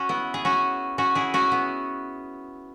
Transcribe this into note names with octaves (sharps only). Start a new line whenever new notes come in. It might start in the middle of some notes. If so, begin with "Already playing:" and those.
Already playing: C#4 F#4
B3 E4
G#4
C#4 F#4
C#4 F#4
E4 G#4
C#4 F#4
B3